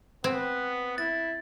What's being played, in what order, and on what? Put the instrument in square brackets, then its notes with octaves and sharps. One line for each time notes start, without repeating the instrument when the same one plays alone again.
[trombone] B3 [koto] C4
[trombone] E4 [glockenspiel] A6